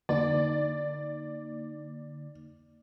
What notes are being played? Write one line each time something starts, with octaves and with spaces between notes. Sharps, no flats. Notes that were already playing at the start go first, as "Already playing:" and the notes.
D3 A#3 D#4 D5